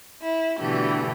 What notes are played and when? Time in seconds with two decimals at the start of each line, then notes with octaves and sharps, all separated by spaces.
0.22 E4
0.61 B2 D3 E3 A3 G4